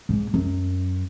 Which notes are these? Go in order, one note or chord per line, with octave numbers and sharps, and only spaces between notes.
G#2
F#2